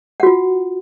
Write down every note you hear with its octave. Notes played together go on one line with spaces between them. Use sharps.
F4 F#4 F#5